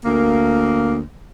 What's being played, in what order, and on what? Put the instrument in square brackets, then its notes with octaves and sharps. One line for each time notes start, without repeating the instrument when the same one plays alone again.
[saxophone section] D2 A#3